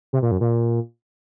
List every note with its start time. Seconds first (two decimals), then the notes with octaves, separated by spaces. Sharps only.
0.13 C3
0.22 A#2
0.31 F#2
0.41 A#2